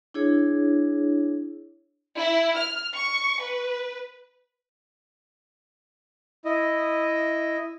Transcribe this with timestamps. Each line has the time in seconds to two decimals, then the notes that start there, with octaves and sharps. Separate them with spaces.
0.14 D4 E4 G#4 C#5
2.17 E4
2.57 F6
2.94 C#6
3.41 B4
6.45 E4 D#5